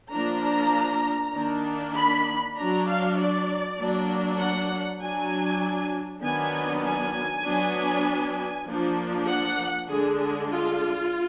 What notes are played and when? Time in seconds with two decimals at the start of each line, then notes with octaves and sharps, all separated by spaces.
0.12 F3 A#3 D4 A#5
1.34 D#3 A#3 D4
1.95 B5
2.56 F#3 D4 A#5
2.87 F5
3.17 D5
3.78 F#3 A#3 D4
4.40 F#5
5.00 F#3 D4 G#5
6.23 D#3 F#3 B3 D4 G#5
6.83 G#5
7.44 F#3 B3 D4
8.66 F3 A#3 D4
9.28 F#5
9.87 D3 G#3 D4 G#4
10.19 G#4
10.49 F4